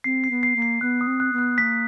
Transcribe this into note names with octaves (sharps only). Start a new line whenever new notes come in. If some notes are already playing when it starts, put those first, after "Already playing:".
C4 C7
C7
B3
C7
A#3
C7
B3 F#6
D#6
C4
F#6
B3
F#6
A#3 B6